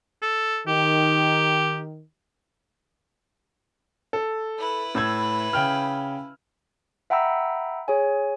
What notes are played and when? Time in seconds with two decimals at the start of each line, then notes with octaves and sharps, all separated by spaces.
0.22 A4
0.68 D#3 G4
4.13 A4
4.58 E4 B4
4.95 A2 E6 G#6
5.53 C#3 G5 F6
7.10 E5 F#5 G5 A#5 B5 E6
7.88 G#4 C#5 G#5